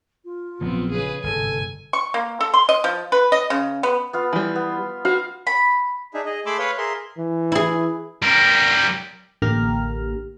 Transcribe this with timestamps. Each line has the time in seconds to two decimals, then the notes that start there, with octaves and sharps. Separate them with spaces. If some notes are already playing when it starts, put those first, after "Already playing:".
0.25 F4
0.61 A#1 F3 F#3 B3 C4
0.91 C#3 G#4 B4
1.23 G1 G#2 C3 A4 G#5
1.93 C#6
2.14 A#3
2.41 A4
2.54 C6
2.69 D#5
2.84 F3
3.12 B4
3.32 D#5
3.50 C#3
3.83 B3
4.13 B3 F4 B4
4.33 E3 G3
4.56 B3
5.05 F#4 F5
5.47 B5
6.14 D4 D#4 G#4 E5
6.25 G#4 D#5
6.46 A3 G#4 B5 C6 D6 E6
6.59 B4 C#5 F5 B5
6.78 G#4 A#4 E5 C6
7.17 E3
7.52 E4 G#4
8.22 G3 A#4
9.42 A1 D3 A#3 G4 A#5 F6